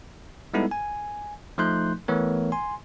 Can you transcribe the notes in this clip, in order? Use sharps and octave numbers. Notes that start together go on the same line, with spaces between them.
G3 G#3 B3 D#4 E4 A4
G#5
F3 A3 D#4 C6 F#6 G6
E3 A3 B3 A#4 C#5
G#5 C6